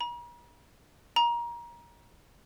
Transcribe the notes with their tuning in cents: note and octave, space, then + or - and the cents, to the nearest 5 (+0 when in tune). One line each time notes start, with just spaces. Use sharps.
A#5 +45
A#5 +25